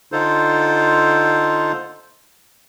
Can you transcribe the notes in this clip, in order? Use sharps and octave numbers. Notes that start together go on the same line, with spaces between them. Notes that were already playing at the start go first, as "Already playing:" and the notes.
D3 D#4 F4 A4 C5